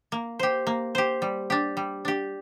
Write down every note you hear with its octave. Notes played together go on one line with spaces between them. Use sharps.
A#3
G4 C5
A#3
G4 C5
G3
D4 G4
G3
D4 G4